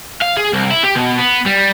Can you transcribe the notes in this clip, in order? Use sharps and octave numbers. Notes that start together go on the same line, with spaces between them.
F5
G#4
C2
E4
G4
B2
B3
G3